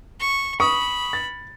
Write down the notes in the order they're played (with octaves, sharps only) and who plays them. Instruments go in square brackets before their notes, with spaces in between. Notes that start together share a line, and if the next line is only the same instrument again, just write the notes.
[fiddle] C#6
[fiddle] B5 [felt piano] C#6 D#6 C#7
[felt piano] A6